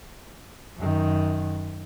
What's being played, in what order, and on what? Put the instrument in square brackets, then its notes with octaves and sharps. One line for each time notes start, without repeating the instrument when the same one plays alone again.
[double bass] F#2 D#3